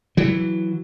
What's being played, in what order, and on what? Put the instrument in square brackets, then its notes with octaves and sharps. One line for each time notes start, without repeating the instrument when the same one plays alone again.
[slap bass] E3 F#3